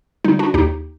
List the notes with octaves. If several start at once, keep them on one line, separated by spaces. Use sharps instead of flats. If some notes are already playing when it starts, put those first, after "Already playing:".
D3 G3 D#4
D4 F#4
D#2 D#4 G4